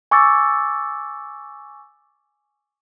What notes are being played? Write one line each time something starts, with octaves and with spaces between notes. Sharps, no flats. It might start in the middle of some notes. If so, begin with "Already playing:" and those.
G#5 C#6 D6 E6 A6